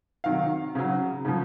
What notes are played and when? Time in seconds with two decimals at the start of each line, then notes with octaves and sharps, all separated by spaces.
0.24 C3 D#3 F#3 F5
0.75 C#3 F#3
1.25 C#3 F3